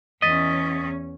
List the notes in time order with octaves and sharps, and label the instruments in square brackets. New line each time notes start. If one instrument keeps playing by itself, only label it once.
[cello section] E2 C#4 [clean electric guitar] D#5 [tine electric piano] D#6 A6 B6